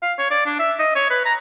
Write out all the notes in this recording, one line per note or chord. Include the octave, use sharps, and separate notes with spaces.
F5
C#5
D5
D4
E5
D#5
C#5
B4
A#5